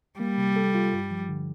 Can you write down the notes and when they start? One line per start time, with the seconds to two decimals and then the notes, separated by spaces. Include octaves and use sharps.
0.19 G3 A#3
0.37 C3
0.56 A4
0.74 F4
0.93 G2
1.11 F3
1.29 D3